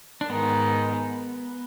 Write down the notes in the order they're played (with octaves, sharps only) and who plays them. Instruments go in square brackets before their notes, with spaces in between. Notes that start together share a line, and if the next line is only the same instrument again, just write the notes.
[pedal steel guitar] D4
[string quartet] G#2 D#3 G#3 D#4 [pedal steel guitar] B3